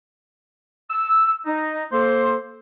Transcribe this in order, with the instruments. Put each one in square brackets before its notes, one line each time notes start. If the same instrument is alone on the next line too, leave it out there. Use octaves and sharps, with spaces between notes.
[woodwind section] E6
D#4
A#3 A4 C5